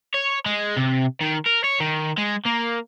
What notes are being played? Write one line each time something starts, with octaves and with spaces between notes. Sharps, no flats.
C#5
G#3
C3
D#3
A#4
C#5
D#3
G#3
A#3